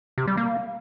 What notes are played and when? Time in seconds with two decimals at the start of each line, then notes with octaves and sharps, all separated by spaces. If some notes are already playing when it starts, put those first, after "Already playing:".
0.18 C3
0.27 G3
0.37 A#3